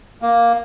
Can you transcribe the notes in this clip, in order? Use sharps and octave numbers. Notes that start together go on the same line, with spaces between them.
A#3